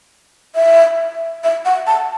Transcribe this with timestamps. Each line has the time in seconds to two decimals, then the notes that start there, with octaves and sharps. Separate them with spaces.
0.56 E5
1.44 E5
1.65 F#5
1.87 A5